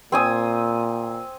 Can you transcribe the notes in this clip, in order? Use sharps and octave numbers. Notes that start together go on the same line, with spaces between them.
A#2 C4 G#5 D#6